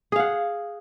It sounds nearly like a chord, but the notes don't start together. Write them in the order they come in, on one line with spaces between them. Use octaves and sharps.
G#4 F5 F#5